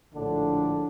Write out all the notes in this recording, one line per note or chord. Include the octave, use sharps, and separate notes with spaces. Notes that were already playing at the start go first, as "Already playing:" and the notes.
A#1 A2 D3 D4